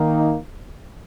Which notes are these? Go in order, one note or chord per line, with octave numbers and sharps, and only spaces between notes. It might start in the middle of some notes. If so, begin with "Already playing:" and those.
Already playing: D#3 A#3 D#4